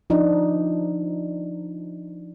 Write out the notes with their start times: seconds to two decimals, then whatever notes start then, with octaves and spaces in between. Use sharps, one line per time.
0.10 F3 D4 D#4